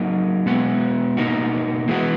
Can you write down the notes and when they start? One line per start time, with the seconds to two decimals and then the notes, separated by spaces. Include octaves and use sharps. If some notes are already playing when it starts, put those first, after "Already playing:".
Already playing: F#3 A#3 D#4
0.46 B2 G#3 B3 F#4
1.17 B2 A#3 D#4 F#4
1.88 E3 G#3 B3 F#4